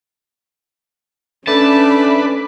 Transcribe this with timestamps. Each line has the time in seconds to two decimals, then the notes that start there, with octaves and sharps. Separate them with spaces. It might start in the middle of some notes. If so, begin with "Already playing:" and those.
1.48 A3 C#4 D4 B4 A5